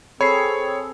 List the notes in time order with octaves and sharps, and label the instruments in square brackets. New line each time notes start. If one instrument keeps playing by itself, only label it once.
[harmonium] C4 G#4 A4 [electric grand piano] C#5 [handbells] B5 C7